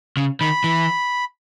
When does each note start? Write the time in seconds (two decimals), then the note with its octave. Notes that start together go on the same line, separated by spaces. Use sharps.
0.17 C#3
0.41 D#3 B5
0.64 E3